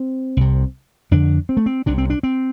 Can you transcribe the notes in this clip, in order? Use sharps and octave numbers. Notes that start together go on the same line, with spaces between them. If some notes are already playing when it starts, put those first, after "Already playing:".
Already playing: C4
C2 C3
F2 D3 D4
C4
A3
C4
C2 C3 D4
C4
D4
C4